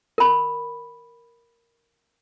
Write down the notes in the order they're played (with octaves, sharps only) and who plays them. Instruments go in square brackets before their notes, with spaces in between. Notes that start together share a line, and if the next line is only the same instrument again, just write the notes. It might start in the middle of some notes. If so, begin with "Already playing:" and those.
[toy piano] A#4 B5